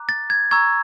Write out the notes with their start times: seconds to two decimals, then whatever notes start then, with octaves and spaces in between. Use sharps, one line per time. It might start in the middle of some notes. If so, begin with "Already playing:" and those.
Already playing: A#5 D6 F#6
0.09 A6
0.30 G#6
0.51 A#5 C#6 E6 G#6